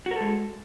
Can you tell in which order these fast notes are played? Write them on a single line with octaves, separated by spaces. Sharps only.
F#4 A#4 A4 G#3